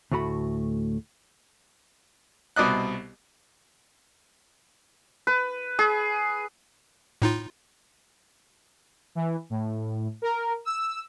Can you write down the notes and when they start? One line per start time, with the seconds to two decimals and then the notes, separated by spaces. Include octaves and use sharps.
0.11 D2 A2 A3 F#4 B5
2.56 C2 B2 D5 D#5 F#6
5.27 B4
5.79 G#4
7.22 A2 D#4 F4
9.15 E3
9.50 A2
10.22 A#4
10.65 E6